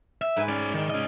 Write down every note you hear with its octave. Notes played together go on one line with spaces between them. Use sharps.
E5
G#2 B4 G#5
C#4 D5
D#3 D5
C#4 D#5